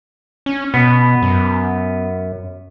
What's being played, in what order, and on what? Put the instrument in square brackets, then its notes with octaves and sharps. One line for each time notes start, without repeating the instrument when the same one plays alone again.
[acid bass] C#4
[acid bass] B2 [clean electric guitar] B3
[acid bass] F#2